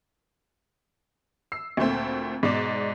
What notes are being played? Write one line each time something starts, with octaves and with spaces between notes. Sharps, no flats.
E6 C7
D2 A#2 A3 C4
G#2 B2 D5 D6 E7